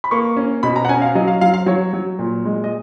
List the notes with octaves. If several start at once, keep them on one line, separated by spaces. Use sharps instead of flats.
B5
A#3 C#6
C#4
B2 B5
A#5
F#5
C#4 G#5
F5
F#3 D#5
F5
F#3 F5
F5
F#3 C#5
F#3
A#2
G#3
D#5